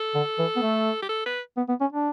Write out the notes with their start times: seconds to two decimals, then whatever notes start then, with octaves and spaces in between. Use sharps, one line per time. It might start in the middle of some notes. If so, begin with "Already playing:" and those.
Already playing: A4
0.15 D3
0.39 E3
0.56 B3
0.62 A3
1.02 G4
1.09 A4
1.26 B4
1.57 B3
1.69 B3
1.81 C#4
1.93 D4